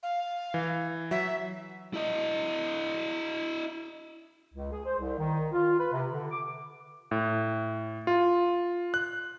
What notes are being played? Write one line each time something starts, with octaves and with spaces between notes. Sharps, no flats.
F5
E3
F#3 E5
E4 D#5
C#2
G#4
C5
C2
D#3
F4
B4
C3
D3
D6
A2
F4
F#6